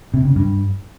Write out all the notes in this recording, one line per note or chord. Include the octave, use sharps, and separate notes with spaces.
C3
C#3
G2